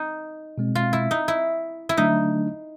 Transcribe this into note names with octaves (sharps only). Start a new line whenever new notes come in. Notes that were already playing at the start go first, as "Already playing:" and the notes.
Already playing: D#4
B2 G#3 C4
F4
E4
D#4
E4
E4
D3 F#3 A3 D4 D#4